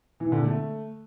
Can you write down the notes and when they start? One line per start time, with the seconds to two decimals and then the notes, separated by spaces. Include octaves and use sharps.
0.20 E3
0.32 D3
0.44 A3